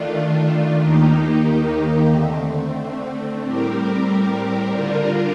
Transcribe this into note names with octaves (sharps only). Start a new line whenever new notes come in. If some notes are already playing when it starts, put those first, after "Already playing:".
Already playing: D#3 A3 D4 F4
D#2 D#3 A#3 D#4 G4
D3 A3 C4
A2 G3 C4 G4 A#4
D3 G3 D4 F4 A#4